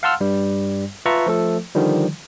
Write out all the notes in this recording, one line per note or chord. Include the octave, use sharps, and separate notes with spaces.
F5 F#5 A5 C6 E6 F6
G2 G3
F4 B4 E5 A5 A#5 C#6
F3 A3 A4
D3 D#3 F3 G3